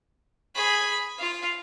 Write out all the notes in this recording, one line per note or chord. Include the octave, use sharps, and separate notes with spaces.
G#4 B5
F4 F5